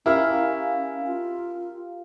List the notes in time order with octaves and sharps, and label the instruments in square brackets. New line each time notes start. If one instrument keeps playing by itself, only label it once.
[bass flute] C#4 [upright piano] E4 [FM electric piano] G4 A#4 F5
[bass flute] F4